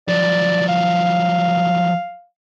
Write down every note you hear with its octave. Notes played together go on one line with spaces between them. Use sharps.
F3 F#3 D5
F5